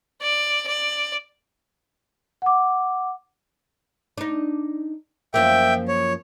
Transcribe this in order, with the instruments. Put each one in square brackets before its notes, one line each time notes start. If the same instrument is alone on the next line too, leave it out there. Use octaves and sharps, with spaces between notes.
[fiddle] D5
D5
[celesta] F#5 D6
[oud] D4 D#4
[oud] F#2 F3 A#3 [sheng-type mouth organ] E5 G5
[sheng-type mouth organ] C#5